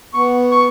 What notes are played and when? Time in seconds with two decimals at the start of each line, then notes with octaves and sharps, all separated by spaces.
0.14 B3 C#6
0.52 C#6